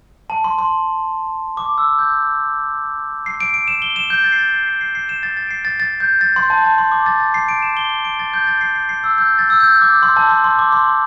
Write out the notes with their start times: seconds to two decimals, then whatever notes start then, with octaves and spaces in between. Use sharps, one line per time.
0.30 A5
0.44 C6
0.59 C6
1.57 D6
1.78 E6
1.99 G6
3.26 C7
3.40 D7
3.54 D7
3.68 E7
3.82 G7
3.96 E7
4.10 G6
4.24 A6
4.32 C7
4.38 A6
4.53 A6
4.67 C7
4.81 C7
4.95 C7
5.09 E7
5.23 A6
5.37 A6
5.47 D7
5.51 C7
5.65 A6
5.80 A6
6.00 G6
6.21 A6
6.36 C6
6.50 A5
6.64 A5
6.78 C6
6.92 D6
7.06 A6
7.20 A6
7.34 C7
7.49 D7
7.62 E7
7.77 G7
8.05 D7
8.19 A6
8.34 G6
8.47 A6
8.61 C7
8.75 C7
8.89 C7
9.04 E6
9.18 G6
9.39 A6
9.50 E6
9.60 G6
9.81 D6
10.03 C6
10.16 A5
10.30 C6
10.44 C6
10.59 D6
10.72 C6
10.86 C6